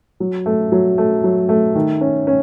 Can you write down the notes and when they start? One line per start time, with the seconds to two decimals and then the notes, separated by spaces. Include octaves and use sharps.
0.20 F#3
0.46 A3
0.72 F#3
0.98 A3
1.24 F#3
1.49 A3
1.75 D#3
2.01 C#4
2.27 C#4